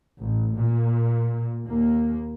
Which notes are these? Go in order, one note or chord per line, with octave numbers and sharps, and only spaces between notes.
A1
A#2
D#2 A#3